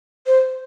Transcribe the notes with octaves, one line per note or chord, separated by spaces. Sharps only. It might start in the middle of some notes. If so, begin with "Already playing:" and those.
C5